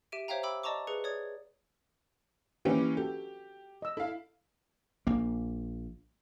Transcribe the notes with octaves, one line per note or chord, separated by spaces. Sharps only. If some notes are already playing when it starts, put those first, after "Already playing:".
G4 E5 D7 D#7
C5 C#5 E5 F5 G5 A#5
G5 B5 D6 E6
D5 D#5 A5 A#5 C#6 D6
G#4 B4 C#7
C#5 D5 D#6 G#6
E3 A#3 C#4 G4 B4 G5
F#4 G4 A4
D#5 E6
E4 A4 F5
A#1 A#3